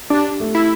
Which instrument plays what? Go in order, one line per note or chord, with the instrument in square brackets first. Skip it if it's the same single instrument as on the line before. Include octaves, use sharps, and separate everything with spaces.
[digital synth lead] D4 [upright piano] G4
[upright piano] A3
[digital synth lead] E4